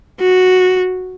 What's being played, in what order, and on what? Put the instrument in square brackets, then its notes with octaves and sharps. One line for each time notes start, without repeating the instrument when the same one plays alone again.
[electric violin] F#4